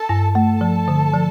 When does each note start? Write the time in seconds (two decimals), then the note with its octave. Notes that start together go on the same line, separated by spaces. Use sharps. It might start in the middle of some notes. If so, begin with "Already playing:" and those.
Already playing: A4 A5
0.09 G2
0.35 A3 A4 A5
0.61 F3
0.88 D3
1.14 F3